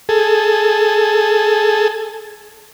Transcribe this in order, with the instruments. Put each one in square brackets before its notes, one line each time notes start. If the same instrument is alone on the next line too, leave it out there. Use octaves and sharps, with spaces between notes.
[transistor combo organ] G#4 A4